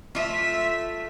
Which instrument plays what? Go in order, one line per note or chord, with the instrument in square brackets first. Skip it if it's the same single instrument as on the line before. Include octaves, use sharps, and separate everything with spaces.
[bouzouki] A3 F4 [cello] E5